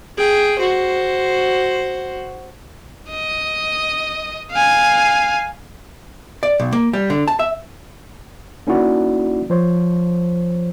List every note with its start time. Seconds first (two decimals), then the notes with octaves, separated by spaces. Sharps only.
0.17 G#4 G5
0.58 F#4 C5
3.10 D#5
4.52 F5 G#5
6.43 D5
6.60 B1
6.73 A#3
6.93 G3
7.10 D3
7.28 A5
7.39 E5
8.67 A#3 C#4 D#4 E4 F#4 D5
9.50 F3 C5 C#5